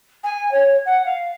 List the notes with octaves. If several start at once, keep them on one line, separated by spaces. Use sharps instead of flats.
G#5
C#5
F#5
F5